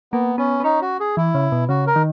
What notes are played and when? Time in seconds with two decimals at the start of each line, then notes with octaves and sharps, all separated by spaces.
0.12 A#3 B3
0.38 B3 C#4
0.60 B3
0.64 C#4 D#4
0.82 F#4
1.00 G#4
1.17 E3 E4
1.35 C#3
1.52 B2
1.69 C#3 F#4
1.87 A#4
1.96 D#3